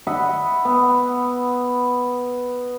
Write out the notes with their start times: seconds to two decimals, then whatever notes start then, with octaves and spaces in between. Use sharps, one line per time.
0.07 D#5 E5 F#5 B5
0.65 B3